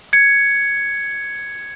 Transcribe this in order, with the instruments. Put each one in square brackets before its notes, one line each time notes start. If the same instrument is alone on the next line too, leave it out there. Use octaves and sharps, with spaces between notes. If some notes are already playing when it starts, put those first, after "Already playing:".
[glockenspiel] G#6 C#7